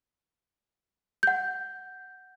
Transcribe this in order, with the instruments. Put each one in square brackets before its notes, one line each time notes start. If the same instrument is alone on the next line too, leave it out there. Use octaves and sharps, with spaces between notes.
[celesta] F#5 G6